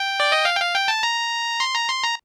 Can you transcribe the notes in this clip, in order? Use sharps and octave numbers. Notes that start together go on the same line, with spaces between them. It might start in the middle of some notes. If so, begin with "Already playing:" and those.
Already playing: G5
D5
D#5
F5
G5
F5
G5
A5
A#5
C6
A#5
C6
A#5